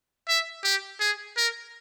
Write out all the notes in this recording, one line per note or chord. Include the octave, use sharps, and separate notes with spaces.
E5
G4
G#4
A#4